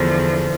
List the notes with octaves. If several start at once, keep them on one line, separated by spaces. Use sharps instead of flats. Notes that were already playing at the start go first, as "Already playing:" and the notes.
Already playing: E2 D3 F3